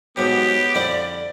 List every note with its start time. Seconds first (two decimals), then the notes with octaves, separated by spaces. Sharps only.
0.17 G#2 F#3 B3 G4
0.75 F2 D3 E4 D5